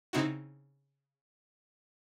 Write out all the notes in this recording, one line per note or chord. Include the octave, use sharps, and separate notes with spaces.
C#3 C4 D#4 E4 F#4